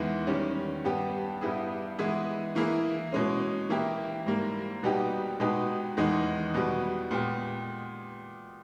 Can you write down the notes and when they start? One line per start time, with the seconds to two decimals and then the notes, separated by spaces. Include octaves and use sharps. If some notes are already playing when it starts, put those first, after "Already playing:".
Already playing: E2 D#3 G#3 B3 E4
0.27 D#3 G3 C#4
0.84 G2 G3 B3 G4
1.41 G2 G3 B3 E4 G#4
1.98 E3 G#3 B3 E4 G#4
2.55 E3 A#3 E4 G#4
3.12 B2 G#3 C#4
3.69 E3 A#3 E4 G4
4.26 G#2 G3 A#3
4.83 B2 G3 B3 D#4 G4
5.40 B2 G#3 B3 D#4 G4
5.97 E2 D#3 G#3 B3 D#4
6.54 B2 G3 B3
7.11 A#2 G#3 B3 G4